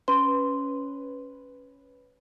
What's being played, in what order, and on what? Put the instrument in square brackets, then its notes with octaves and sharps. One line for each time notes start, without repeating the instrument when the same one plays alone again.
[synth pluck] C#4 B4 [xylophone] C6